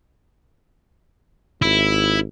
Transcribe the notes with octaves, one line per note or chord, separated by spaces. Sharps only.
G#1 E4